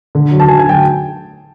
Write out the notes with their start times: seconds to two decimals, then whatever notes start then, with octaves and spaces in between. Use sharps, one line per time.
0.15 D3
0.31 F#3
0.40 A5
0.48 D3 G#5
0.59 G#5
0.65 F#3 G5